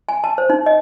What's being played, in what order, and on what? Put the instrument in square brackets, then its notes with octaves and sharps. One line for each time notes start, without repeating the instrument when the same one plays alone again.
[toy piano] G#5
A5
C5
D#4
D#5